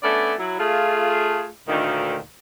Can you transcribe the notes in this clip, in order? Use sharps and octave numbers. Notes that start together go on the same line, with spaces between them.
A3 B3 C#4 D4 A4 D5
F#3 E4
A3 F4 G#4
D2 A#2 D#3